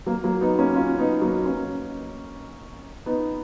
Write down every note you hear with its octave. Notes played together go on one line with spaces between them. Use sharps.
F#3 A#3
F#3 A#3
B3 D#4
A#3 C#4
C#4 F4
B3 D#4
F#3 A#3
A#3 C#4
B3 D#4